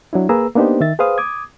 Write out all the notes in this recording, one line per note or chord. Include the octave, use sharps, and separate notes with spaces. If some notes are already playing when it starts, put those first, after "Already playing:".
F#3 D4 E4
A#3 G#4 B4 A#5 E6
A#3 B3 D4 D#4 G4 C5
D#3 E5 A6
G#4 B4 C5 F5 D#6
D6 D#6 G#6